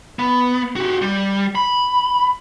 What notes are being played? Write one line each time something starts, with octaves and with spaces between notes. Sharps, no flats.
B3
F#4 G4
G3
B5